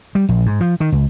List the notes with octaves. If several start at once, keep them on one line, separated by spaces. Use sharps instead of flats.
G3
A#1
G#2
F3
D#3
C#2